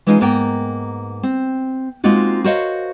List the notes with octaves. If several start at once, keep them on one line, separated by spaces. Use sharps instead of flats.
E3 G#3 C#4 D#4 F4
G#2 A#3 B3 A#4 G5
C4
G#3 A#3 C4 D#4 F4 F#4
F#4 A#4 C5 C#5 D#5 F5